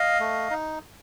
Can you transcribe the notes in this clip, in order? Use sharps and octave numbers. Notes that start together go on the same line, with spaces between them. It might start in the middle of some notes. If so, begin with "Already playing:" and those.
Already playing: D#5 F5
A3
D#4